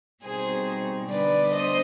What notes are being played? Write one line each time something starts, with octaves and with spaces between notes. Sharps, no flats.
B2 G3 C4 D#4 G#4 C5
D3 G3 B3 D4 B4 D5
C5 D#5